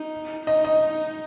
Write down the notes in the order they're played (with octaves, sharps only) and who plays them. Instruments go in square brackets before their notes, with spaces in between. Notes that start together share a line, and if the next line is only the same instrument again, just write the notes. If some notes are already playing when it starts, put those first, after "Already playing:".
Already playing: [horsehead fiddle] D#4
[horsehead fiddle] D#4 [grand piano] D#5
[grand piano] D#5